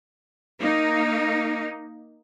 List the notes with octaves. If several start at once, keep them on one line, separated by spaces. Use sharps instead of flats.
A#3 D#4